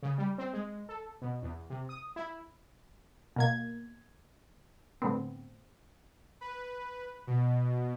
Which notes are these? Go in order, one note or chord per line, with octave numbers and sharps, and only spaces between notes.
C#3
G3
C4
G#3
A4
B2
E2
C3
D#6
E4
B2 A#3 G#6
A2 D3 B3 C4
B4
B2